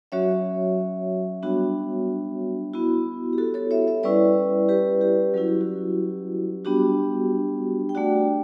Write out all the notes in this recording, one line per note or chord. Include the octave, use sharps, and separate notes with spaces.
F#3 C#4 F#4 C#5 E5
G3 B3 D4 F#4
B3 E4 F#4
G4
F#4 A4
A4 C#5
C#5 E5
C#5 E5
G3 C#4 E4 B4 D5
G4 B4
G4
F#3 C#4 E4 F#4
G4
F#4
G3 B3 D4 F#4 G4
G5
A3 D4 F#4 D5 F#5